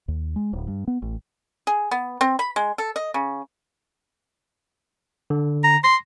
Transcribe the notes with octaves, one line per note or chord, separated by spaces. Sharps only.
D#2
G#3
D1
G2
B3
A1
G#4
B3
C4
B5
G#3
A4
D#5
C#3
D3
A#5
C6 A#6